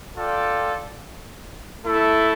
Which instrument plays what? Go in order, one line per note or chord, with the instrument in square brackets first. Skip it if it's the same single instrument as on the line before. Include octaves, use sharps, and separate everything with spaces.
[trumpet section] F4 A4 D5 G5
A3 E4 A4